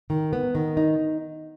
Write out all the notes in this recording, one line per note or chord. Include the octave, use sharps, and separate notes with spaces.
D#3
B3
D#3
D#4